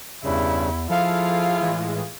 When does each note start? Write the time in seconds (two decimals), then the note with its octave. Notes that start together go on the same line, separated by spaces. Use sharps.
0.24 E2 G2 C#3 E4
0.90 F3 E4 F4 G#4 A4 F5
1.60 A2 E3 G#3